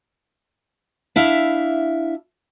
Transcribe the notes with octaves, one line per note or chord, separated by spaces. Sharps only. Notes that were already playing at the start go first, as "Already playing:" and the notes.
D4 E4 E5 F5